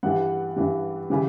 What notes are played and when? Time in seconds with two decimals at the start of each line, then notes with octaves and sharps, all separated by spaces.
0.03 G2 E3 G3 F#5
0.56 G2 E3 G3
1.10 C#3 E3 G3